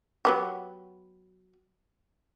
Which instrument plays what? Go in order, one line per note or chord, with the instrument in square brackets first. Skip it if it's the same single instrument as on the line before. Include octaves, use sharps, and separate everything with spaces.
[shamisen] F#3 B3 G4